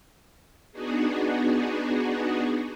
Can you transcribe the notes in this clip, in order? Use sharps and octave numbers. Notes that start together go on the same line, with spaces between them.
B3 D4 D#4 F#4 G#4